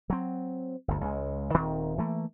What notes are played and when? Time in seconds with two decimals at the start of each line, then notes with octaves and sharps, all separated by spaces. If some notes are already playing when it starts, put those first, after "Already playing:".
0.10 F#3 C4
0.88 G1 D2
1.01 C#2 G#3
1.54 D#1 D#3 C4
1.98 E3 A3 A#3